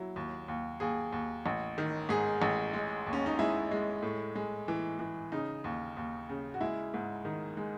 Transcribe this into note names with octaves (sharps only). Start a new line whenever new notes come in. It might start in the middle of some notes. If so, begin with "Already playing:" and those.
Already playing: F#3 E4
D#2
D#2
D#2 G#4
D#2
A1
D#3
G#2 G#4
A1
G#3
D#2
C#4
D#4
G#3 E4
G#3
A2
G#3
E3
E3
C#3 D#4
D#2
D#2
C#3
F#4
G#3 E4
G#2
D#3
G#3